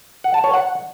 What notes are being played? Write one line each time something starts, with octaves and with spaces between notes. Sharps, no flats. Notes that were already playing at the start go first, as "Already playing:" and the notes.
F#5
A5
C#5
F#5